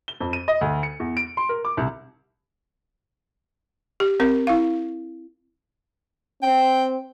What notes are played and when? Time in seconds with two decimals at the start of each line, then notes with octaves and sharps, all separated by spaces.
0.08 G7
0.20 F2
0.33 D#7
0.48 D#5
0.61 D2
0.83 C#7
1.00 E2
1.17 D7
1.37 C6
1.49 A#4
1.65 D6
1.77 C2
4.00 G4
4.20 C4 A#4
4.47 E4 F5
6.43 C4 G5